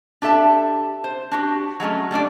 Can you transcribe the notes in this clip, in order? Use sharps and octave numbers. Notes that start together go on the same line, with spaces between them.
D4 G4 A4 E5 A5
C5
D4 F#4 G4
F#3 G#3 A3 C#4
G3 A3 D4 D5